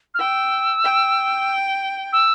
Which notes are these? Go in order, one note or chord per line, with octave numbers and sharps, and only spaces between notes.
F6
G5 E6
G5
E6